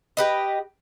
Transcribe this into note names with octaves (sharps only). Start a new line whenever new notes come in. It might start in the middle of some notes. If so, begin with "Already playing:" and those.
G4 B4 D#5